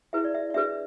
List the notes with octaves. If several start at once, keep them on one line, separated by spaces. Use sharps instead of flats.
E4 G#4 B4 E5
D5
E5
D5
D4 G#4 B4 E5